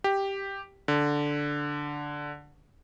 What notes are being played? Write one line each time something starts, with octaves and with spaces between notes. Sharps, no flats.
G4
D3